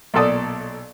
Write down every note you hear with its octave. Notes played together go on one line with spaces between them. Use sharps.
B1 A#2 A4 D5 D#6